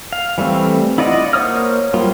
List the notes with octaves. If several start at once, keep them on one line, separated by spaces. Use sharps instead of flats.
F5
E3 G3 A3 C4
E4 F4 D5 D#5 F#5
A#3 C5 C#5 D#6 F6
F#3 G3 A#3 F4